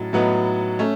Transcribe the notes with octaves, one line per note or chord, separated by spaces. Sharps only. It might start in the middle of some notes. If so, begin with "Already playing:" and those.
Already playing: A2 F#3 A6
A2 F#3 B3 D#4
A3 C#4